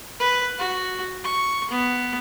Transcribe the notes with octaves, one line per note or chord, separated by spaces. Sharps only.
B4
F#4
C#6
B3